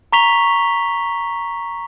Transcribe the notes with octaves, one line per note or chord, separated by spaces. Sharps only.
A#5 C#6 B6 F7 G7